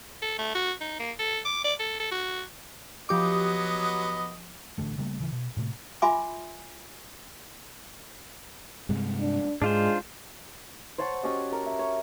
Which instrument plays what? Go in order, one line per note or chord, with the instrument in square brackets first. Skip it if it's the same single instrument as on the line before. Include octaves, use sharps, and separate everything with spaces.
[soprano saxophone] A4
A3
F#4
D#4
A#3
A4
D6
D5
A4
A4
F#4
[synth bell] F3 G4 D6 [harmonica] F#3 B3 D#5
[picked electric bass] A1 B2 D3 A3
C#3 G3 A3 A#3
D1 C#3 E3
B2
A2 C3 A3
[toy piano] F4 E5 G#5 B5 C6 D6
[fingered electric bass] G2 C3 G#3
[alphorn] D4
[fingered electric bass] G#2 [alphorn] G#3 [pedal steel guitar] D4 F4 C5
[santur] C5 C#5 F#5 A5
C#4 F#4 G4 D#5
A#4
E5
C#5